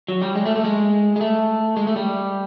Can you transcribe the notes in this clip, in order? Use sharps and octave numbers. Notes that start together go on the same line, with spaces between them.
F#3
G3
G#3
A3
A3
G#3
G#3
A3
G#3
A3
G3